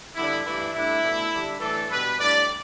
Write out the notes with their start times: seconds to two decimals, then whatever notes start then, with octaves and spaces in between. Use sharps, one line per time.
0.15 D3 G3 B3 D4 E4
0.44 G2 E3 A3 D4 E4
0.74 A2 G3 D4 E4
1.03 B2 A3 D4
1.33 D3 G3 D4
1.60 A2 E3 A3 D4 A4
1.90 B2 G3 D4 B4
2.19 A2 G3 D4 D5